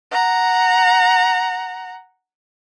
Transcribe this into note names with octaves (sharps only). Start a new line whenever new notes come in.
F#5 A#5